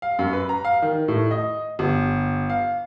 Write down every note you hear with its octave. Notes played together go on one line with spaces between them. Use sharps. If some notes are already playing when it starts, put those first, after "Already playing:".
F5
F#2
B4
A#5
F5
D#3
A2
D#5
G1
F5